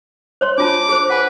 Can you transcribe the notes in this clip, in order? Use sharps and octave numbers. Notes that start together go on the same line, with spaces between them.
C5 C#5 C6
D4 F4 A5 D6
G#4 C5
B4 F#5 G#5